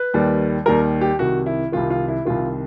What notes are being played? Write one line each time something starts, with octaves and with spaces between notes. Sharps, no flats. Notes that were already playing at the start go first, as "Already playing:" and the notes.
Already playing: B4
D#2 D#3 G3
D#2 D#3 G3 A#4
G4
C2 C3 D#3 F#4
E4
C2 C3 D#3 F4
F4
E4
C2 C3 D#3 F4